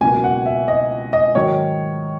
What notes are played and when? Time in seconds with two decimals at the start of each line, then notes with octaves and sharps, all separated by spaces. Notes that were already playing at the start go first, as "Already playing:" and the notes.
0.01 C#2 B2 F#3 A#3 G#5
0.24 F#5
0.46 E5
0.68 D#5
1.13 D#5
1.35 G#2 D#3 F#3 C#5